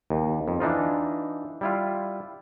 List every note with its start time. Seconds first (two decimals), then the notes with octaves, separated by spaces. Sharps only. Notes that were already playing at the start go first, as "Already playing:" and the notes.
0.10 D#2
0.48 F2
0.60 E3 D4 D#4 F4
1.61 G3 E4 F4